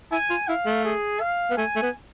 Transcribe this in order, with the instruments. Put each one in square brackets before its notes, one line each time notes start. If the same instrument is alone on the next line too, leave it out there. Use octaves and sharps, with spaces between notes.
[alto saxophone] E4 [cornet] G#5
[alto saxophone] F4
[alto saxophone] E4 [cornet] F5
[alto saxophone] A3
[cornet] G#4
F5
[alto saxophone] B3
[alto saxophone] A3 [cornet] G#5
[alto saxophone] A3
B3